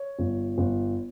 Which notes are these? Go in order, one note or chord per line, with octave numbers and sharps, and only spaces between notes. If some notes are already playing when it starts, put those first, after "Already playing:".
Already playing: C#5
G1
G1